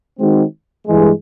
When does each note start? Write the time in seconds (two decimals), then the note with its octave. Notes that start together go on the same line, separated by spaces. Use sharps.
0.19 D#3 G#3 C4 D#4 F#4
0.87 G2 E3 G#3